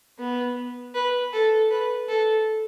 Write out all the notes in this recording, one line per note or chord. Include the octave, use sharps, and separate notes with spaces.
B3
B4
A4
B4
A4